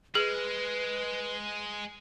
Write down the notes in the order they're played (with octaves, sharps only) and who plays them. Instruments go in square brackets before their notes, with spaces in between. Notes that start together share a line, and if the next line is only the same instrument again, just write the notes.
[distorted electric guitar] G#3 [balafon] G#4 [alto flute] B4